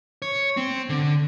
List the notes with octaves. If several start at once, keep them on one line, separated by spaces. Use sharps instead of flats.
C#5
C4
D3